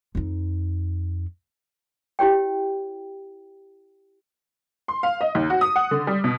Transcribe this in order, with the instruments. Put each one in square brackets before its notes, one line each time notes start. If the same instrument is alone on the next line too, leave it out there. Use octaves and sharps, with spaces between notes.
[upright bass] F2 D#4
[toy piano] E4 G4 C#5 G5
[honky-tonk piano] C6
F5
D#5
D#2
F#4
D#6
F#5
D3
G3
B2